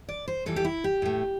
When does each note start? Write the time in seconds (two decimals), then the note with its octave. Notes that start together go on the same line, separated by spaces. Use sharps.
0.09 D5
0.28 C5
0.46 G2 E3 G3 A4
0.56 G4
0.65 E4
0.84 G4
1.02 A2 A3